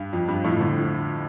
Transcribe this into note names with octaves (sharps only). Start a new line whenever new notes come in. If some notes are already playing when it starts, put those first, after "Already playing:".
Already playing: G2
F2
G2
F2 A2
A2 D3